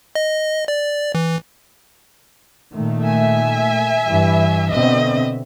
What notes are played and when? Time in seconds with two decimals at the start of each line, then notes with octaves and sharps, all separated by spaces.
0.15 D#5
0.68 D5
1.15 E3
2.73 A#2 D#3 A3
3.05 E5 G#5
4.06 G2 E3
4.71 B2 D3 C4 D#5